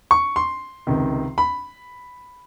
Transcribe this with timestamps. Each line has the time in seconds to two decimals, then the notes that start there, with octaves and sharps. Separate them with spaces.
0.11 C#6
0.36 C6
0.87 C#2 C3 D#3
1.38 B5